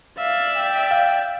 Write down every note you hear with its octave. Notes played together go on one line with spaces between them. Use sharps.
D5 E5 F5
G5
F5